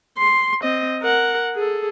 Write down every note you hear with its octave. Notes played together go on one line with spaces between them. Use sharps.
C6
C4 D#5
A#4 F#5
G#4 A4